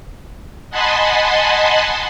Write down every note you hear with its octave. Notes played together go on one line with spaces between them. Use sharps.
D#5 F#5 G#5 A5 B5 C6